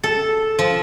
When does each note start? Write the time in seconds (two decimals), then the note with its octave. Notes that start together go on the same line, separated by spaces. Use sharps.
0.03 A4
0.59 F3